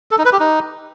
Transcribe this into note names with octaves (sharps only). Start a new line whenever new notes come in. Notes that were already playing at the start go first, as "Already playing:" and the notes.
A4
D#4
B4
G4
D#4